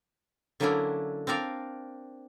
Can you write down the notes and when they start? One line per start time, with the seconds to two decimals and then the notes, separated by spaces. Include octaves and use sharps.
0.60 D3 F#3 A#3 C#4 D4 E4
1.27 C4 D4 A#4 D5 F5